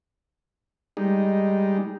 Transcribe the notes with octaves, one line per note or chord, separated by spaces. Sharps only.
G3 G#3 D#4